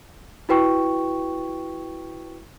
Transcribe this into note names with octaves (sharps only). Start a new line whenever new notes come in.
E4 F#4 B4 G5 C#6